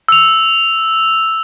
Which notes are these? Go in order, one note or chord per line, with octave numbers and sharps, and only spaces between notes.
E6 F7